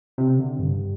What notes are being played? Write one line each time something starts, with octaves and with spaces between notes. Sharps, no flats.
C3
D3
G2